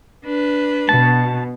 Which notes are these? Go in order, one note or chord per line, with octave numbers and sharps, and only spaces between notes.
D4 B4
B2 A5